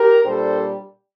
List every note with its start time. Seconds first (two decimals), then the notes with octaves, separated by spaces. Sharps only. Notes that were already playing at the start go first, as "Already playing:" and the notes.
Already playing: G4 A#4
0.25 A#2 G3 D4 A4 C5